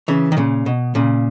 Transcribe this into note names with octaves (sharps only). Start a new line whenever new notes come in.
C#3 E3
D#3
A#2 C#3
B2
A#2 C#3